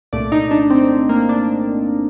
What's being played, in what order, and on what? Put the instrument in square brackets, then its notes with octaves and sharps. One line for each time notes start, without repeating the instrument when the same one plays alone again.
[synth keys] C2 A#2 A3 D5
D#4
D4
C4
A#3
D4